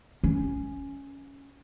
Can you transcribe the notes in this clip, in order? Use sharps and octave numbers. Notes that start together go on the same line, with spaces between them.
C#4